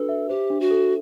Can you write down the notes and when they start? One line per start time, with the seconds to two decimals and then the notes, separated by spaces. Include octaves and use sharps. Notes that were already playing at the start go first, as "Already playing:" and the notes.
Already playing: D4 F#4 A4 B4
0.09 E5
0.29 G4 C5
0.50 D4
0.61 F#4
0.71 A4